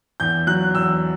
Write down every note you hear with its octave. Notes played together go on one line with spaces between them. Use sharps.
E2 G6
F#3 F#6
E2 E6